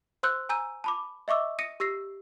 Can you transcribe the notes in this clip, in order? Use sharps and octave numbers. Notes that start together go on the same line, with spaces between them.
C5 C6 E6 F#6 G6
G#5 A#5 E6 G6 D#7
A5 B5 D6
D#5 E5 C#6 D6 E6
D#6 A#6 C#7 D#7
G4 E6 A#6 C7